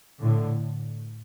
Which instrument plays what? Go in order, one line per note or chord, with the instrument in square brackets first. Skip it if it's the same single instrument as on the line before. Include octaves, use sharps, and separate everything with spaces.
[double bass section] A2 D3